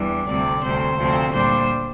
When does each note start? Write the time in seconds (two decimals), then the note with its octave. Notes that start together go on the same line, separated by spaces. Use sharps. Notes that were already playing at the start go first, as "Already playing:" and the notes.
Already playing: E2 E3 G3 D4
0.27 D2 C3 G3 C4 D5
0.62 D2 C3 G3 C5
0.97 D2 C3 F3 C4
1.32 A#2 G3 D4 C5